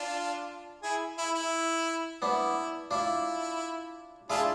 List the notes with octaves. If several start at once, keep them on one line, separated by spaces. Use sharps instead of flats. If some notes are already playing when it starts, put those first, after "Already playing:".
Already playing: D4 F4
E4 G#4
E4
E4
B3 D4 E4
D4 E4 F4
D4 E4 F4 G#4